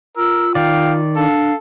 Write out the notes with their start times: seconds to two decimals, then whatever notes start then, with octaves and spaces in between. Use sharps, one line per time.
0.17 F4 A#4 E6
0.55 D#3 D5 F5 G5
1.16 D4 A4 F5